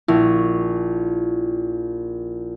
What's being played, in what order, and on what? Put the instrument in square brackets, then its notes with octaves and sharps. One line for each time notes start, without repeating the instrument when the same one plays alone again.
[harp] A#1 [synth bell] E4